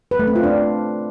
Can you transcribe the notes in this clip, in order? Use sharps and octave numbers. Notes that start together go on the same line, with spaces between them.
B4
A3
C4
F4
D4